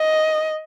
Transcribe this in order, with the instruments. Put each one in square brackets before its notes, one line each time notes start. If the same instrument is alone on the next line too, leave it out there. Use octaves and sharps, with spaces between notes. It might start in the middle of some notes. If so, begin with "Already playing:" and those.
Already playing: [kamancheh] D#5